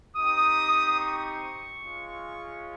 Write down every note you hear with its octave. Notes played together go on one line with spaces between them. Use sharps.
C4 D#4 G4 D#6
C#6
G#3 C#4 F4